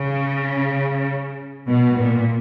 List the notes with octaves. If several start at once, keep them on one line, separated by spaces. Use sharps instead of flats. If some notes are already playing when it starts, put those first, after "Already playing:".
Already playing: C#3
B2
A#2